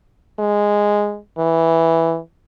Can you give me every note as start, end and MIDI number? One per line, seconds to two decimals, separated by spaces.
0.39 1.18 56
1.38 2.18 52